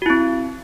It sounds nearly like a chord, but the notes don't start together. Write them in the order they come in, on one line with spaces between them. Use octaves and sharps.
F#4 E4 C4